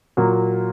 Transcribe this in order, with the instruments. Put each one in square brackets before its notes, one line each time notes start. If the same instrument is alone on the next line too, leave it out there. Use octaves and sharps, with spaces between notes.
[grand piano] A#2 F#3 A#3